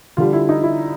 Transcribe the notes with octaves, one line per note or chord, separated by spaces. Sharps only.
D3 G3 F4
E4
D#4
E4